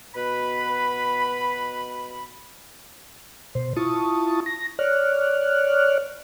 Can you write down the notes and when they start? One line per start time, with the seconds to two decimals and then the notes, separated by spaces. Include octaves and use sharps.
0.15 B2 B4 B5
3.55 B2 C5
3.76 E4 F4 A5 C#6 D#6
4.46 A#6
4.79 C#5 D5 F6 F#6